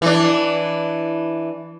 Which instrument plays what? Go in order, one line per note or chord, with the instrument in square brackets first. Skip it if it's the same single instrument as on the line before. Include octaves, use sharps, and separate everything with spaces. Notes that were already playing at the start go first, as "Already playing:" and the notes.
[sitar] E3 D4